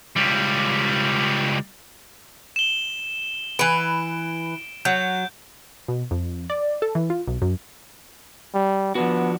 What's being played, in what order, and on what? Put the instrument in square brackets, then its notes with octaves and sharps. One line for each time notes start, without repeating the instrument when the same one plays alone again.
[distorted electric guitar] C#2 G3
[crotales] E7 G7
[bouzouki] E3 B4 [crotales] D7
[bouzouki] F#3 [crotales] G6
[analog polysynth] B2
F2
D5
A4
E3
F4
B1
F#2
[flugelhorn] G3
[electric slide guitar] F3 D4 F#4 [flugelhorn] B3